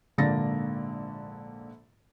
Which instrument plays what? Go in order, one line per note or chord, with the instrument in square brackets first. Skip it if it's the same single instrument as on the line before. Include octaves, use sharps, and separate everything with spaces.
[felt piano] A#1 G#2 D3 A#3 A6 A#6